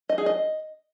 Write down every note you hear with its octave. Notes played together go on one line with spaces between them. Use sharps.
D#5
G#4
D#5